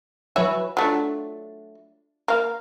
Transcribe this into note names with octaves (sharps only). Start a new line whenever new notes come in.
E3 F#3 F#4 B4 C#5 E5
F#3 A3 D4 F4
A#3 F5